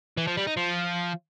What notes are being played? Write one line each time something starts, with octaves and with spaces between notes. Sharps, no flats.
E3
F3
G3
D#4
F3